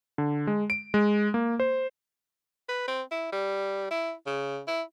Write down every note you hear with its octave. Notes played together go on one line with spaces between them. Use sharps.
D3
G#3
D7
G#3
A#3
C5
B4
C4
E4
G3
E4
C#3
E4